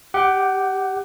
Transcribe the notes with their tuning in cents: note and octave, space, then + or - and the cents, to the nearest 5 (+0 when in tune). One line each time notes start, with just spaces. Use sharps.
G4 +0 F#5 +25